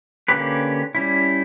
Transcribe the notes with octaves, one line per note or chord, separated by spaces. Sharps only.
D3 A#3 C#4 G4 B4
G3 C#4 E4